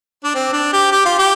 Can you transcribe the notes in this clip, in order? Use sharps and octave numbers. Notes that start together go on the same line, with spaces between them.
D4
C4
D4
G4
G4
F4
G4